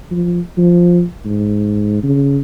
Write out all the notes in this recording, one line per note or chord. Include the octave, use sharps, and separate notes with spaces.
F3
F3
G#2
C#3